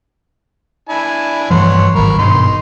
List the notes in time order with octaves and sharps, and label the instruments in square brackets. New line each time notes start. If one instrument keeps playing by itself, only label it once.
[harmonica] D4 E4 G#5
[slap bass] G2 E3 F3 [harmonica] C#5 F#5 C6
[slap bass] G#1 F#3 [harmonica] A#4 B5 C#6
[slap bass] G2 B2 [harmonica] D#4 C6